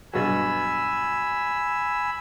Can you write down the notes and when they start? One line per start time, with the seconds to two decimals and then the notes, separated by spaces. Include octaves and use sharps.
0.14 G2 B2 F#3 G#5 B5 E6